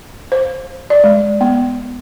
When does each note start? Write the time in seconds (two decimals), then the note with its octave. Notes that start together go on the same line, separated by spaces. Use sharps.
0.32 C5
0.90 D5
1.04 G#3
1.41 B3